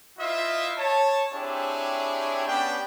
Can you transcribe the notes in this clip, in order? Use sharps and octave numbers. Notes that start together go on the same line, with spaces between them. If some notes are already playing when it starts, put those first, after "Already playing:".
E4 F4 C5 D#5 E5
C#5 A5
C4 D4 E4 G4 G#4 C#5
B3 C#4 D4 G4 G5